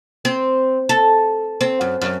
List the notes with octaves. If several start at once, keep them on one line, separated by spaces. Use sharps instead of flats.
C4
A4
C4
F#2
F#2